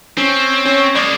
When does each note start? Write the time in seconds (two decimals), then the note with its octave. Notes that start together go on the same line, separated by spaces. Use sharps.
0.17 C4 C#4
0.65 C#4
0.95 G#3 A#3 D5